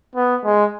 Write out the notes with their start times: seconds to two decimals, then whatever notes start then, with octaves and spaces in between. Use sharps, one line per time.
0.15 B3
0.45 G#3